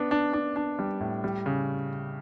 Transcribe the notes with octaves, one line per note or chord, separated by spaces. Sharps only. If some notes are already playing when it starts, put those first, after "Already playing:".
Already playing: B3 D4
D4
D4
D4
G3
A2
G3
C#3